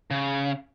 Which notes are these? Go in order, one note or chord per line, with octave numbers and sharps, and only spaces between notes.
C#3